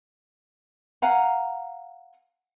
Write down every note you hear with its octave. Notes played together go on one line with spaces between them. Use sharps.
F5 F#5 G#5 A#5